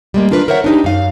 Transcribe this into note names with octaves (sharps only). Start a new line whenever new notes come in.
G3 G#3 A#3
D4 F4 A#4 B4
A#4 C5 C#5 E5 F#5
D4 D#4 G4
F#2 F5